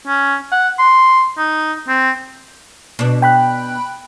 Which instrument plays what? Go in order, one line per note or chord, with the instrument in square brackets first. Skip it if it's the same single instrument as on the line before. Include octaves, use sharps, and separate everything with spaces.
[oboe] C#4
F#5
C6
D#4
C4
[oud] B2 D4
[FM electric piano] G5 B5 F#6